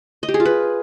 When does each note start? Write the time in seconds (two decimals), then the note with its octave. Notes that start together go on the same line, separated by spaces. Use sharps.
0.23 D#5
0.29 G4
0.34 G#4
0.40 F4
0.45 B4